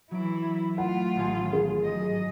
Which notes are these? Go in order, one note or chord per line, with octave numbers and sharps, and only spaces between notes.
E3 F#3 E4 D7
A3 F4 F#5
A1 D#3 G#5
G#4
G#2 F#3 D#5